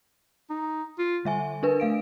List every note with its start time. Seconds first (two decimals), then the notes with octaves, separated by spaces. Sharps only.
0.50 D#4
0.99 F4
1.25 D3 G3 E5 G#5
1.63 D4 A#4 B4
1.80 A3 F5 D7